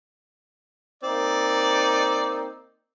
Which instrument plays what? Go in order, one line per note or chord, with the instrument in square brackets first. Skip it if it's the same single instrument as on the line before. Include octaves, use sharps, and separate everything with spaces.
[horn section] A#3 C4 D#4 [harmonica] D5